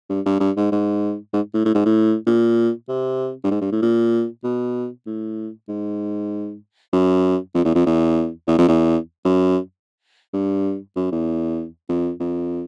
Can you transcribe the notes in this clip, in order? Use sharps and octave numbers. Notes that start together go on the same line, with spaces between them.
G2
G2
G2
G#2
G#2
G#2
A2
A2
G#2
A2
A#2
C3
G2
G#2
G2
A2
A#2
B2
A2
G#2
F#2
F2
E2
F2
E2
E2
F2
E2
F#2
G2
F#2
E2
F2
F2